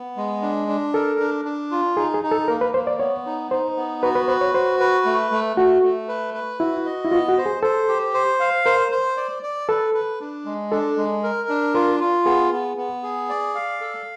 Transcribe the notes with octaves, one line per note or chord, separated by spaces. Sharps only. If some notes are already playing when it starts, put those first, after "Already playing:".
Already playing: B3
G#3
D4
D4
A4 A#4
D4
D4
F4
D#4 G#4
G#4
D#4
A4
A#3 A#4
B4
A#3 C5
D5
B3 C#5
D#4
D#4 C5
B3
F#4 B4
B4
B4 C5
C#5
F#4 C5
B4
A3
A3
A3 F#4
A3
B4
B4
E4 F#4
D#5
E4
B3 F4
F#4
C5
G#4
A4 C5
G4
C5
F5
A#4 C5
C5
D5
D5
A4 B4
B4
D4
G#3
D4 A4
G#3
A#4
D4
F4 A#4
F4
B3 G#4
B3
B3
G#4
D5
F5
A4